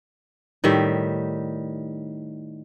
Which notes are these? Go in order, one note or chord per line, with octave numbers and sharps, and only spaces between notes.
A2 D#3 G3 E5